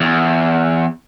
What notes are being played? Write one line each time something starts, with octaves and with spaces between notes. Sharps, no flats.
E2